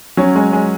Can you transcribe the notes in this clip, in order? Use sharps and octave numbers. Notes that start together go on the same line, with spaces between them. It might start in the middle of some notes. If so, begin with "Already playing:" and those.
F#3 C#4
G#3
G#3